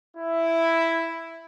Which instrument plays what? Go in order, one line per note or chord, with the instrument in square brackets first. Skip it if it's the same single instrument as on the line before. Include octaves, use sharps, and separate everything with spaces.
[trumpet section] E4